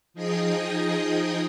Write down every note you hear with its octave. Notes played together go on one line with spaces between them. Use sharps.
F3 D#4 G#4 D#5 G5 D#6